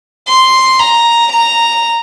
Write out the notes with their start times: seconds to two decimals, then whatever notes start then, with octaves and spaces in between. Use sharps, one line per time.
0.28 C6
0.79 A#5
1.32 A#5